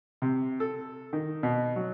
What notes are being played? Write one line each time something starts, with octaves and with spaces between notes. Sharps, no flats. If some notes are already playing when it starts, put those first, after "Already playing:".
C3
A4
D#3
B2
F#3